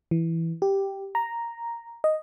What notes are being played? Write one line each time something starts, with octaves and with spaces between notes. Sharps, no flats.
E3
G4
A#5
D#5